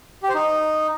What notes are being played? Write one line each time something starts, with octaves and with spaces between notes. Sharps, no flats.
G4
C5
D#4